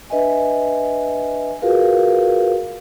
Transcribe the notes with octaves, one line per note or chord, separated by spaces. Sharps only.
D4 B4 D#5 E5 G#5
F4 F#4 G#4 A#4 B4 F5